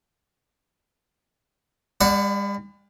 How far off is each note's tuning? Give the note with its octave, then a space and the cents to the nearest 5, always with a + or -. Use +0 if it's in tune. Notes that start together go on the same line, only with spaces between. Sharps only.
G3 +45 D5 +0 F#5 +0